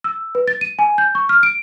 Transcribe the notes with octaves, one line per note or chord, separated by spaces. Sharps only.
E6
B4
A6
D#7
G#5
G6
C#6
F6
D7